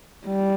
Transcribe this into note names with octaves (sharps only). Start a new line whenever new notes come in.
G3